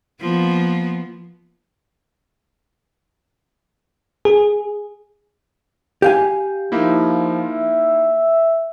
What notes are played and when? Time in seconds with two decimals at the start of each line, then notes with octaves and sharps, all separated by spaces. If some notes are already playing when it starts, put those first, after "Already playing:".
0.20 F3 A#3 B3
4.25 G#4
6.02 G4 F5 G#5
6.72 F3 A#3 D#4 E4
7.50 E5